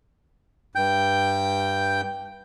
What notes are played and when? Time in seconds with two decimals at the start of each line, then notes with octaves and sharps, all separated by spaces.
0.75 G2 G5 G6